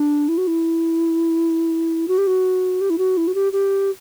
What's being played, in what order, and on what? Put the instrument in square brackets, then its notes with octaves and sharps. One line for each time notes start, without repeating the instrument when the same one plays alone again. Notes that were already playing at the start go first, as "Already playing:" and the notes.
Already playing: [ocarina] D4
E4
F#4
E4
F#4
G4
F#4
G4
E4
F#4
E4
F#4
G4
G4